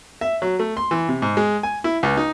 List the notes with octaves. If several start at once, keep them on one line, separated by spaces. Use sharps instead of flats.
E5
F#3
A3
C6
E3
C3
G#2
G#3
G#5
E4
C#2
D#4